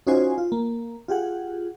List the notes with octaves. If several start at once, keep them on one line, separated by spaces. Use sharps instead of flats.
C#4 D#4 F4 F#4 C5 G#5
F4
A#3
F4 G4 G#4 F#5